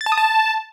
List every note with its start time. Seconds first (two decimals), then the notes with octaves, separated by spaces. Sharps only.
0.01 A6
0.06 A5
0.12 D#6
0.17 A5